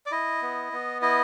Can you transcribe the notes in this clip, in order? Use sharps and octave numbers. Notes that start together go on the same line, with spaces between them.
D5
E4 D#5
B3
B3
E4 D#5